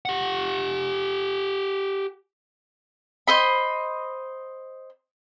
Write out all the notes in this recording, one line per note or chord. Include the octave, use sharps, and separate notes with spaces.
G4 F#5
C5 D#5 B5